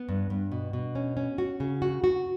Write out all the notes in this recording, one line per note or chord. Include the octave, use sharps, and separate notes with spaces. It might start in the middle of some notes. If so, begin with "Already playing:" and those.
Already playing: B3
G2
G2
B2
B2
C#4
C#4
F#4
C#3
F#4
F#4